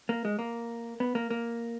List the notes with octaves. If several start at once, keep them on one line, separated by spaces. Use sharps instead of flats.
A#3
G#3
A#3
B3
A#3
A#3